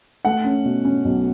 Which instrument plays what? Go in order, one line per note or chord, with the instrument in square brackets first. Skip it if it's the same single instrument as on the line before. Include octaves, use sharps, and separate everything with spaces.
[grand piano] A3 F#5
C#4
B2
C#4
B1